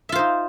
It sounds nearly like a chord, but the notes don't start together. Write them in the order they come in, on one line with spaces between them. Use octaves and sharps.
E5 F4 C5 D#4